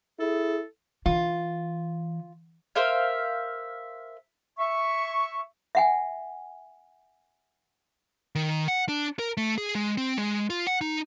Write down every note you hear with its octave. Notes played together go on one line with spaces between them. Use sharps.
E4 G#4 A4
E3 F4
A#4 C5 E5 F5
E5 C#6
E5 F#5 G#5
D#3
F#5
D4
A#4
A3
G#4
G#3
C4
G#3
F4
F#5
D#4